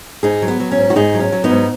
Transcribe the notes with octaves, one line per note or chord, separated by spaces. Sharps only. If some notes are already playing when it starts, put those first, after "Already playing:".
G#2 D#4 G#4
F#3
B3
F#3
C#4
G#2
F#4
G#2 D#4 G#4
F#3
C#4
F#3
B3 D#4
G#2